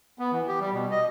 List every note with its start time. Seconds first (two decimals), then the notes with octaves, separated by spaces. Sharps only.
0.19 B3
0.32 E3
0.48 G4
0.60 G3
0.73 B2
0.91 D#5